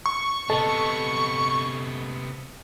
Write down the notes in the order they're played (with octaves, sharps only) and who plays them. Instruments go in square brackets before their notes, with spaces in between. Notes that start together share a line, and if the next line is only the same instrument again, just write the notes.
[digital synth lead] C#6
[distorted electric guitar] C3 B3 [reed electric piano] A4 D#5 A5